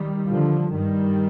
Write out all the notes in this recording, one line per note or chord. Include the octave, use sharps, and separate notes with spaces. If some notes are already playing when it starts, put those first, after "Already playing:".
Already playing: D#3 G3
D3 F3
G2 D#3 G3